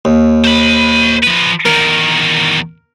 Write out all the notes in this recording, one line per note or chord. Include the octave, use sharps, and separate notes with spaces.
D#2
C5 B5
F3 B4
E2 D#3 A#4